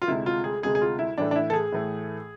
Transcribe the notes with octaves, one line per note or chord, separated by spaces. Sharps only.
F4
D2 C3 G#3 E4
F4
G#4
D2 C3 G#3 G#4
G#4
F4
E4
A2 E3 A3 D4
D4
E4
A4
G#4
A2 E3 A3